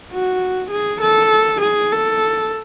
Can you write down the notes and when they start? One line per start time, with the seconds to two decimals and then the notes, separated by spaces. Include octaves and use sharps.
0.12 F#4
0.71 G#4
1.02 A4
1.62 G#4
1.92 A4